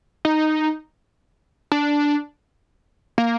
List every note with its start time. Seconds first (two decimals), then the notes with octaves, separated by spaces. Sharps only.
0.25 D#4
1.72 D4
3.18 A#3